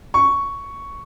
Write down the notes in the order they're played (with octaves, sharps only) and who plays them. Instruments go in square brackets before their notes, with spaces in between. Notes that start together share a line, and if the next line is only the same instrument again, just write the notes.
[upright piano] C#6